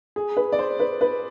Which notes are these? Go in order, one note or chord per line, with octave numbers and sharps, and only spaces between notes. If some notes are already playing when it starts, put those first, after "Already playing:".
G#4
B4
D5
C5
B4
B4